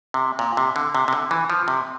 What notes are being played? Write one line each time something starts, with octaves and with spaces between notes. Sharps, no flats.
C3
A#2
C3
D3
C3
C3
D3
E3
F3
C3